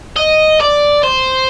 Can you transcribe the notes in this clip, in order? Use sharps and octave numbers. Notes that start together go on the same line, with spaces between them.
D#5
D5
C5